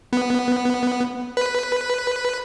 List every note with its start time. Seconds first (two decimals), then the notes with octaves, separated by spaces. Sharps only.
0.13 B3
1.37 B4